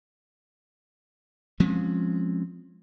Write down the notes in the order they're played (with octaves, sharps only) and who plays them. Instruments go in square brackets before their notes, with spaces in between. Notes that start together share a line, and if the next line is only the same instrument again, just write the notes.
[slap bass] F3 G#3 C4 C#4